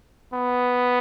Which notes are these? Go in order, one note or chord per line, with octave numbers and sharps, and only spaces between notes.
B3